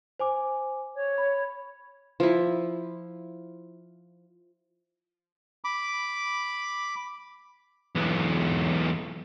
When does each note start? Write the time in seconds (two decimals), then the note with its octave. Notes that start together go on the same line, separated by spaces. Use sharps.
0.20 C5 G#5 D6
0.95 C#5
1.18 B5
2.20 F3 E4
5.64 B5 D6
7.95 B1 E2